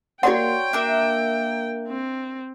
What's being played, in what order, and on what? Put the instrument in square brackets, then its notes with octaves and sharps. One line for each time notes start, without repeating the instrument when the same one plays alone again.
[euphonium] A#3 [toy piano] F#4 D5 F#5 [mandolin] C#5 A#5 C6 [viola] G5
[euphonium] A#3 [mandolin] D4 A#4 E5
[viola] C4